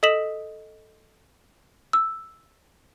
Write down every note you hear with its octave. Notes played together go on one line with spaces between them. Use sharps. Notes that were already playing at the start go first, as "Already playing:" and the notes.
A4 D#5 D#6 B6 E7 F#7
E6